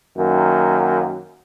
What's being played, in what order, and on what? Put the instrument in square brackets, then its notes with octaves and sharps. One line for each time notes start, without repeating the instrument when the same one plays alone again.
[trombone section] F#2 D#3 A#3